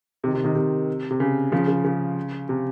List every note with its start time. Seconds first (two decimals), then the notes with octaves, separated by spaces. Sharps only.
0.24 C3 D#3
0.34 C3 D#3
0.44 C3 D#3
0.55 C3
1.11 C3
1.20 C#3
1.52 C#3 F3
1.68 C#3
1.84 C#3
2.49 C3